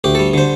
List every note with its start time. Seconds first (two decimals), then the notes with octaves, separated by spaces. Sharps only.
0.04 D2 G4
0.15 G3 A4
0.34 D3 C5